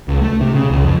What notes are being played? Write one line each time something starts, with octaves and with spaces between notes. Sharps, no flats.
C#2
A3
C3
C#3
C#2
F2